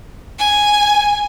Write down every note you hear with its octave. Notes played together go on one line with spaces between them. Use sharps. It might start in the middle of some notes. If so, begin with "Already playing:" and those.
G#5